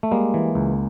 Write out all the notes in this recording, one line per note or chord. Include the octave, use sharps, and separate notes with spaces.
A3
G3 G#3 A#3
E3
C#2